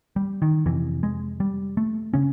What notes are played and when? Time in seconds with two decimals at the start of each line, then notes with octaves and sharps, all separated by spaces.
0.16 G3
0.42 D#3
0.66 F2 C3 E3
1.03 G#3
1.40 G3
1.77 A3
2.14 C#3 C#4